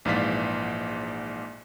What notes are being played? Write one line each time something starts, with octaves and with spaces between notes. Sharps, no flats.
A#1 G#2 E3 D5 F5 B6